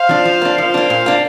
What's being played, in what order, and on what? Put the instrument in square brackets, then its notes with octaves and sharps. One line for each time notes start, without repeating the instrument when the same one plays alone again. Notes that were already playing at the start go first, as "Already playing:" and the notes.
Already playing: [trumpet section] C5 F5
[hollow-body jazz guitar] F3 D4
F3
A#3 D4
[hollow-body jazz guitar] F3 [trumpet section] C5 F5
[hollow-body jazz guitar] A#3 D4
A#2
A#3 D4